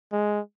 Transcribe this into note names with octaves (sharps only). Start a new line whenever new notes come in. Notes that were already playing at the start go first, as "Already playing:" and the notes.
G#3